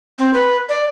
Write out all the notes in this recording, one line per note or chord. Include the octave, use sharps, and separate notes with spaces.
C4
B4
D5